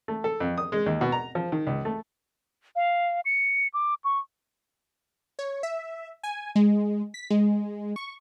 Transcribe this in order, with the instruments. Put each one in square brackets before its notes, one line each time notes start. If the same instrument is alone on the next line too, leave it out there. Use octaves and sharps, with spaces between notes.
[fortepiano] A3
A4
F2
D#6
G#3
D#2
B2
A#5
F3
D#3
C#2
A3
[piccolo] F5
C#7
D6
C#6
[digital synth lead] C#5
E5
G#5
G#3
B6
G#3
C#6